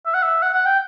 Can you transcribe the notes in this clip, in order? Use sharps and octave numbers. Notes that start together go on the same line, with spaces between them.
E5
F#5
E5
F#5
F#5
G5